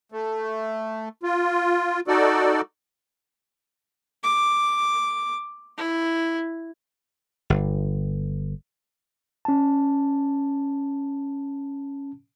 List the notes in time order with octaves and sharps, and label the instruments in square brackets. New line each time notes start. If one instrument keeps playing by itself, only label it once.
[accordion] A3
F4
D#4 F#4 A4 D5
[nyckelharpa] D6
E4
[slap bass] G1
[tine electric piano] C#4 A5